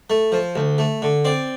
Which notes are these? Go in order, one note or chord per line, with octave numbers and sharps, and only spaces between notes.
A3
F3
D2
A3
D3
C4 D5